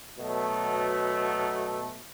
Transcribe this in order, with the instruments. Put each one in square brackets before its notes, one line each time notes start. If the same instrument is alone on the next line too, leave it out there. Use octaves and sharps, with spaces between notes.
[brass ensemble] B2 F#3 A3